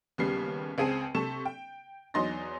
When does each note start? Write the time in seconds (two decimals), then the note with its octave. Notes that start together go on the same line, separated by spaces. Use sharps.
0.18 D#2 C#3 G3 B3 C7
0.78 C#2 C4 G#4 A5 C7 D#7
1.15 C3 A4 C#6 E7
1.45 G5
2.14 E2 F#3 D#4 C6 A6 A#6